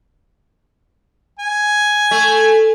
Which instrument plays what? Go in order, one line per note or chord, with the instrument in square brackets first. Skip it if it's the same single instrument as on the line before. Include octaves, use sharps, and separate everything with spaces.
[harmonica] G#5
[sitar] A3